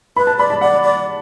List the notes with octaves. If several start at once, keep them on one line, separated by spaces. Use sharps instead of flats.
B4 B5
A5
D5 B5
A5
D5 F#5
D5